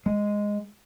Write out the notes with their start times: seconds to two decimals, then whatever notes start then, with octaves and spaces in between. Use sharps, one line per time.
0.06 G#3